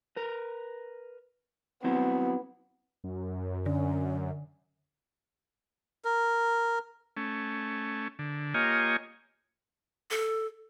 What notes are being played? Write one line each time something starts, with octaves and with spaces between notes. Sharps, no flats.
A#4 B4
F#3 B3 C4 E4
F#2
D3 C#4
A#4
A3 C#4
D3
A#3 F4 G4 C#5 D#5 G#5
A4